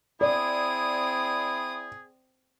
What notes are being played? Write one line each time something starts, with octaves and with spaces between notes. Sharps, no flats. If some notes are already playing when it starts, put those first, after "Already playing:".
C4 E4 G#4 D5 D#6